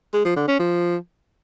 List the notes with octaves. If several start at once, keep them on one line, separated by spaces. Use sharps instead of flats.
G#3
F3
D3
C#4
F3